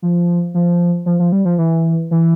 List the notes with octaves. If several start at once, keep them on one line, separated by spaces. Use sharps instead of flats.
F3
F3
F3
F3
G3
F3
E3
E3